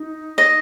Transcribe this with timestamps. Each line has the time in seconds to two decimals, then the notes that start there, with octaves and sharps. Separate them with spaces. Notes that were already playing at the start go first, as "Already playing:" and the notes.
Already playing: D#4
0.38 D#5